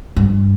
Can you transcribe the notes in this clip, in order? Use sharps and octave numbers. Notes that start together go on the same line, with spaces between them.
G2